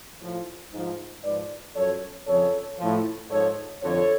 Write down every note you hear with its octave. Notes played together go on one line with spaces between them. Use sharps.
A2 F3
G#2 F3
G#2 F3 B4 D5
F#2 F3 A4 C#5
F2 C#3 F3 A4 C#5
A2 F3
G#2 F3 A4 C#5
F2 D3 F3 A4 C#5